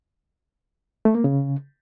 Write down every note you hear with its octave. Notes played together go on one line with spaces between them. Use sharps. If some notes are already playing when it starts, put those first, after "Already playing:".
A3
A#3
C#3